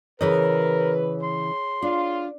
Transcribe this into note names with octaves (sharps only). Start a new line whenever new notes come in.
C#3 E3 G#4 A#4 B4 C#5 D#5
C6
D4 F4